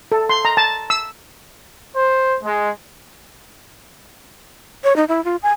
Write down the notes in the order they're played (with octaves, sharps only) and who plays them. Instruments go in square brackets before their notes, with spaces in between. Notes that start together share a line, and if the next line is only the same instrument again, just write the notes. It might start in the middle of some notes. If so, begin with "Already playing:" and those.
[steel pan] A4
C6
A#5
A5
E6
[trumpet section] C5
G#3
[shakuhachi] C#5
D#4
E4
F4
G#5